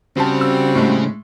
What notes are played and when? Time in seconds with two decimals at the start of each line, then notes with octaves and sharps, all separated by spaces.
0.17 C#3 G3 C4 F#4 C5 A5
0.41 E6
0.75 A2 G#3 A3